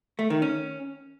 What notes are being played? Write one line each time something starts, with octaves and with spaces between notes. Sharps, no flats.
A3
D#3
C#4